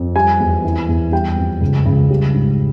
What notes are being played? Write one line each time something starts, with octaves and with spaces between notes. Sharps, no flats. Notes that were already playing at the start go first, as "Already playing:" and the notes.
Already playing: F2
G3 G#5
E2
E3
E2
G3 G5
F2
C#2
C#2
G3
G#2